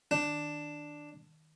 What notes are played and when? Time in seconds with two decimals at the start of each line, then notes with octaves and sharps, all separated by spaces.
0.11 D#3 D4